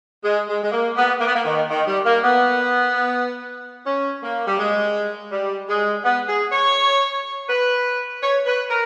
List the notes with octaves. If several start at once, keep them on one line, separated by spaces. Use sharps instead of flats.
G#3
G#3
G#3
A#3
B3
A#3
B3
A#3
D#3
D#3
G3
A#3
B3
C#4
A#3
G3
G#3
G3
G#3
B3
G#4
C#5
B4
C#5
B4
A#4